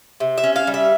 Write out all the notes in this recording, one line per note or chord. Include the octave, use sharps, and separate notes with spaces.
C3
E5
C#4
F5
G3
E5